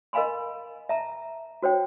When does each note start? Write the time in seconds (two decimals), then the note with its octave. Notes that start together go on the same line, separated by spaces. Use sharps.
0.13 A#4 D#5 F5 G#5 B5 C6
0.89 E5 A5 A#5
1.63 F#4 C5 C#5 G5